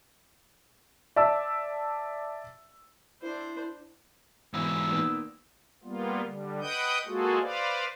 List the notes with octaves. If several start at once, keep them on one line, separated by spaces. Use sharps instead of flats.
D5 E5 A5 E6
D4 E4 C5
B1 G#2 E3 E6
A#2 D#3 B3
G3 A#3 B3 F4
D3 G3
B4 D#5 F#5 G5 D#6 G6
G#3 A#3 F4 F#4 G#4 A4
B4 C5 D5 F5